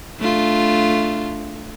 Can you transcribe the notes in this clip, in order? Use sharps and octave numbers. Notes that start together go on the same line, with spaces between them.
A3 D4 F4